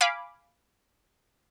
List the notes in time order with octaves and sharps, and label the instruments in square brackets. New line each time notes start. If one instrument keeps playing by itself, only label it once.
[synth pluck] F5 G#5 B5 D6